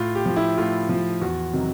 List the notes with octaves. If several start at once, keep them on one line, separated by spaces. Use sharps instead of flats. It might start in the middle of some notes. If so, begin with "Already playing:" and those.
Already playing: A2 F4
G4
F3
E4
A2 F4
F3
E2 F#4
C3 D#3 F#3